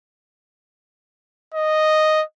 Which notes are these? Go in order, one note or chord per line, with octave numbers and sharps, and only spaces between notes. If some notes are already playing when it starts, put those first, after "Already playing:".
D#5